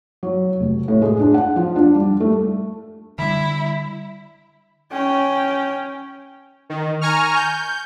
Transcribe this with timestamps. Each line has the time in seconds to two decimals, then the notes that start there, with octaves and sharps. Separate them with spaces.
0.23 F#3
0.60 F1
0.88 A2
1.02 G#3
1.19 D4
1.34 F#5
1.56 F3
1.76 D4
1.96 G3
2.20 A3
3.18 D3 G3 E4
4.92 C#4 G5
6.70 D#3
7.01 G#5 A#5 C#6 F6
7.36 G6